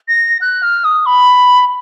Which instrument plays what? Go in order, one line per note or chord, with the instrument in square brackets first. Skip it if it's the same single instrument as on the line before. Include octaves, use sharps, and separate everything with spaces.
[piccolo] A#6
F#6
F6
D#6
B5